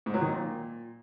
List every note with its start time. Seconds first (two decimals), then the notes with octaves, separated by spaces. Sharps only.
0.06 G#2
0.14 F#3
0.21 D#3
0.29 A#2